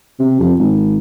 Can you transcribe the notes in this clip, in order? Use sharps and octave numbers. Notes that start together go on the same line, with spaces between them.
C3
F2
G#1